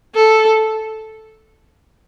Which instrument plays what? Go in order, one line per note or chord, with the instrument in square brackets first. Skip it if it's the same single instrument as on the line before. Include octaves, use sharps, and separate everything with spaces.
[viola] A4